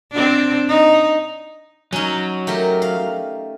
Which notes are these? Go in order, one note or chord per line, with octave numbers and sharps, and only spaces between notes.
C4 D4
D#4
F#3 C#4 D#4
A3 G4 A#4
F5